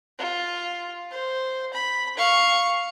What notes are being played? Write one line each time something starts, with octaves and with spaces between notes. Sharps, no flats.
F4
C5
B5
F5 C#6